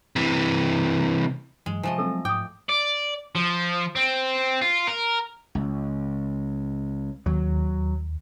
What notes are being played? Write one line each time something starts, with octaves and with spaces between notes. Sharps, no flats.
C3 E3
G2 E3 F#3 G#3
C3 F3 A3 D#5 G#5
F#3 G#3 C4 A4 E6
G#2 G5 D6 D#6
D5
F3
C4
F4
A#4
C#2
D#2 F#3